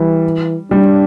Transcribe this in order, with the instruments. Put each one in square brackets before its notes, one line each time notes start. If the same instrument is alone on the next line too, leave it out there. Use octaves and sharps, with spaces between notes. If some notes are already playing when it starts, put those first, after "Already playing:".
Already playing: [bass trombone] E3 [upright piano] G3
[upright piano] G3 [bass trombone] D4